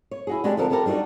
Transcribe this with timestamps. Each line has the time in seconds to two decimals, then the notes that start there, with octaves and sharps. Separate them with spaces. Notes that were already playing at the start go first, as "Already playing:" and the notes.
0.11 C#5
0.27 E4 F#4 G#4
0.44 G#3 D4 F#4 G4 A4
0.57 D3 F3 C4 A4 A#4
0.70 B3 E4 G4 A4 A#4
0.86 G3 D4 D#4 F#4